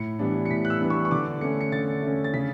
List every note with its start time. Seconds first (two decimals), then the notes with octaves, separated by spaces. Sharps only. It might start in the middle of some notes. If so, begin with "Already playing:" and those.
Already playing: A2 C#7
0.19 E3 G3 B3 D4
0.46 C#7
0.51 A2 B6
0.65 F#6
0.70 E6
0.81 E3 G3 B3 D4
0.90 C#6
1.05 C#6
1.11 D3 D6
1.41 A3 C#4 C#7
1.61 C#7
1.72 D3 A6
2.02 A3 C#4
2.24 A6
2.34 C#3 B6